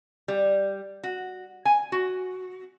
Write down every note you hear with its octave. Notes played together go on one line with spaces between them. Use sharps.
G3
F#4
G#5
F#4